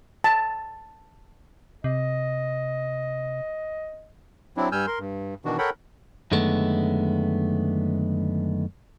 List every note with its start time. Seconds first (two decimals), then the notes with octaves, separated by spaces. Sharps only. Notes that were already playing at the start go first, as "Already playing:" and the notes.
0.24 A5
1.84 C3 D#5
4.57 F#3 C4 D4 E4
4.72 G2 G3 G#5 E6 F6 G6
4.87 A#4 C6
4.99 G2
5.45 B2 D#3 E3 D4 F#4
5.58 A4 A#4 C#5 F#5 G5 B5
6.32 F#2 D3 D#3 G#3 A3 B3